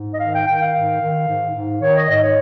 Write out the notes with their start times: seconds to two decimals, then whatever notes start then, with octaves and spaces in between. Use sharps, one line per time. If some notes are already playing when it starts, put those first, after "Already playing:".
Already playing: G#2
0.11 D#5
0.20 D#3 F5
0.33 G5
0.46 D#3 G5
0.60 F5
0.74 G#2
1.00 D#3
1.27 G#2
1.54 G#2
1.81 D#3 C#5
1.95 D#5
2.08 G#2 D#5
2.22 C#5